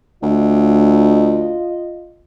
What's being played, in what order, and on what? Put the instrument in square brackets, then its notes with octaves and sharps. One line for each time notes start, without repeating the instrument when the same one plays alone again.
[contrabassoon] D2 [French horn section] F4 D#5